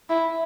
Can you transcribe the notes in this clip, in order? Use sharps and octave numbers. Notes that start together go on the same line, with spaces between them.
E4